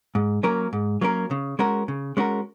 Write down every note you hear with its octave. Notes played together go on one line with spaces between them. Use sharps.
G#2
F#3 A#3 C#4 A#4
G#2
F#3 A#3 C#4 A#4
C#3
G#3 C#4 F#4 A#4
C#3
G#3 C#4 F#4 A#4